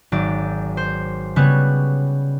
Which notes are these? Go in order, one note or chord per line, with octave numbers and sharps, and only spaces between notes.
G#1 F#3 D5
C5
C#3 G3 B3 C#5 F#6 G#6